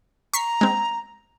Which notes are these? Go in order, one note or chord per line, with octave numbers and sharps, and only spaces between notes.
A#5 C#6 B6 C7
G#3 C4